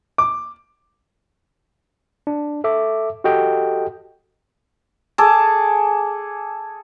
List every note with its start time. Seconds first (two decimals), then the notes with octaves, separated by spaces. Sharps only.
0.18 D6
2.27 D4
2.64 A4 E5 D6
3.24 F#4 G4 A4 D#5 G5
5.18 G#4 A4 D6